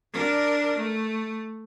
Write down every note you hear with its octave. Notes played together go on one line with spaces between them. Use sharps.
D4 A#4
A3